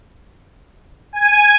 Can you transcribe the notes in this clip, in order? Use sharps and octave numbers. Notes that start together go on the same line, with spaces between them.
G#5